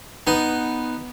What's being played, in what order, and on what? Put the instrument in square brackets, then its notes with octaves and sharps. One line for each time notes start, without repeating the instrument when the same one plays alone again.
[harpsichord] B3 D#4